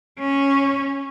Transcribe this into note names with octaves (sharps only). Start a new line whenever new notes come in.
C#4